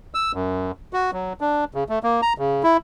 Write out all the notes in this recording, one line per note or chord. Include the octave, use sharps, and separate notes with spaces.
E6
F#2
F#4
F#3
D4
C#3
A3
A#3
A#5
C#3
E4